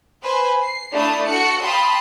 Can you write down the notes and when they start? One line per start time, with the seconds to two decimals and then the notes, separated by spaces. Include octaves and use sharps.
0.21 B4 C5 G#5
0.62 C7
0.92 A3 D4 E4 F5 A5 D#6
1.26 F#4 A4 F#5 F#6 C#7
1.61 F5 G5 A5 B5 C6 D#6